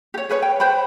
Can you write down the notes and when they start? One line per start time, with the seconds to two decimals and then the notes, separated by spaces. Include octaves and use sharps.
0.14 G4 C#5
0.29 G#4 B4 C#5
0.42 G5
0.60 B4 C5 G5 B5